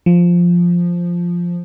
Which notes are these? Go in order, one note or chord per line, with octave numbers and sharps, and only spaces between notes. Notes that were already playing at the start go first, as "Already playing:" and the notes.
F3